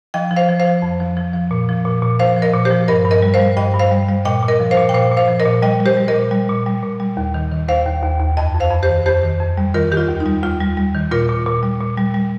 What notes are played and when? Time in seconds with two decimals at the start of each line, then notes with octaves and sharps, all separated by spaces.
0.14 F3 D#5 G5
0.31 F3
0.36 C5 F5
0.48 F3
0.60 C5 F5
0.65 F3
0.82 F2
1.00 F3
1.17 F3
1.34 F3
1.51 A#2
1.69 F3
1.85 A#2
2.02 A#2
2.19 F3 C5 F5
2.36 F3
2.42 A#4 D#5
2.54 A#2
2.65 G4 C5
2.71 F3
2.88 G2 A#4 D#5
3.05 G2
3.11 A#4 D#5
3.22 G3
3.34 C5 F5
3.40 G3
3.57 G2 D#5 G5
3.74 G2
3.79 C5 F5
3.91 G3
4.09 G3
4.25 A#2 D#5 G5
4.42 A#2
4.48 A#4 D#5
4.60 F3
4.71 C5 F5
4.77 A#2
4.89 G5
4.94 A#2 C5 F5
5.11 A#2
5.17 C5 F5
5.28 F3
5.40 A#4 D#5
5.46 A#2
5.62 G3 D#5 G5
5.80 G3
5.86 G4 C5
5.97 G3
6.08 A#4 D#5
6.14 A#2
6.31 G3
6.49 A#2
6.66 G3
6.83 A#2
7.00 G3
7.17 D#2
7.34 D#3
7.52 D#3
7.68 D#2 C5 F5
7.86 D#2
8.02 D#2
8.20 D#2
8.37 F2 D#5 G5
8.54 F2
8.60 C5 F5
8.71 F2
8.83 G4 C5
8.89 D#3
9.06 F2 G4 C5
9.23 D#3
9.40 F2
9.58 G3
9.74 D#3 F4 A#4
9.92 D#3 G4
9.97 F4
10.08 D#2
10.20 D#4
10.26 G3
10.43 D#2 F4
10.60 G3
10.77 G3
10.94 D#3
11.11 A#2 F4 A#4
11.29 A#2
11.46 A#2
11.63 G3
11.80 A#2
11.97 G3
12.14 G3